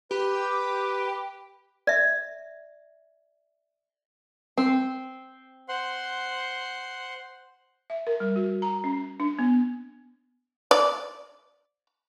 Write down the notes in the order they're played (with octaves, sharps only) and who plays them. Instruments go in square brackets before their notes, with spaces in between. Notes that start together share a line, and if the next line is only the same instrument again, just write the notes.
[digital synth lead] G4 [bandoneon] B4
[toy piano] D5 E5
[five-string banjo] C4
[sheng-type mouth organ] C5 F#5 C6
[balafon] E5
A#4
G3
F#4
A#5
C#4
D4
B3
[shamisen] D5